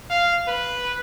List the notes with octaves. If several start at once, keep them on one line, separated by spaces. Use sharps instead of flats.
F5
B4